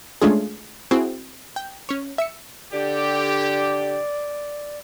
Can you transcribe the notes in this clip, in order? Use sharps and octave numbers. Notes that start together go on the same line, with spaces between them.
G#3 A3 C#4 D4 F4 G#4
C4 E4 F#4 G#4
G5
C#4 C#5
E5 E6 C#7
D3 G4 D5